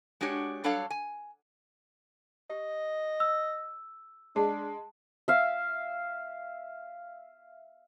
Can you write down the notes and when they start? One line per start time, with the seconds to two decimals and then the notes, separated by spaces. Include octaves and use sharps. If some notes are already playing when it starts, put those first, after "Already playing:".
0.21 G#3 D4 F#4 G4 C#5
0.64 F#3 G3 D4 A4 C#5 F5
0.90 G#5
2.50 G4 D#5
3.20 E6
4.36 G#3 D4 A5
5.28 E5 F5